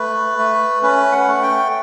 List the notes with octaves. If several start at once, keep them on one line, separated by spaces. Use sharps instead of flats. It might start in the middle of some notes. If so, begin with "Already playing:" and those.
Already playing: A3 B4
A3
C#4 B4
F#5
A3
G5